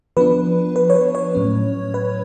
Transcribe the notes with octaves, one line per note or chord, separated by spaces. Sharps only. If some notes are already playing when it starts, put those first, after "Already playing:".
F3 B3 D4 B4
B4
C#5
B4
C#5
A2 F#3 C#4
B4